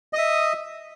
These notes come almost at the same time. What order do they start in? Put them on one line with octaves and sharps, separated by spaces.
D#5 D#6 E5